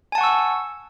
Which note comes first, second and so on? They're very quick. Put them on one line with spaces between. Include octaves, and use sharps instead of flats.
G#5 A5 F#5 C#6 E6